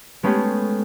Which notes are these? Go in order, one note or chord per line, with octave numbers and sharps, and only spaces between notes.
G#3 A3 B3 C#4 G4 G#4